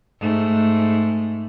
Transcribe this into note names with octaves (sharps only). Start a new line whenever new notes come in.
G#2 A3